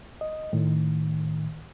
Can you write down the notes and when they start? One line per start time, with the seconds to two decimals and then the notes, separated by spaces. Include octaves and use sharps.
0.21 D#5
0.53 A2 D#3